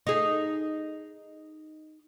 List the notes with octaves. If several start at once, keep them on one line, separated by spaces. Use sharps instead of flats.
D#4 G#4